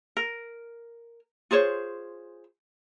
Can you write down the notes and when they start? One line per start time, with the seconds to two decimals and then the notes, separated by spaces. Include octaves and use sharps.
0.17 A#4
1.51 F4 G#4 C5 C#5